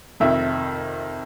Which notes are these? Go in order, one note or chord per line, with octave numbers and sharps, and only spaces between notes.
F2 C3 D#3 E5